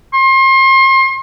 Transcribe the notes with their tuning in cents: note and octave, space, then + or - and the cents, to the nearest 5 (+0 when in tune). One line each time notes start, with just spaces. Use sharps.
C6 +35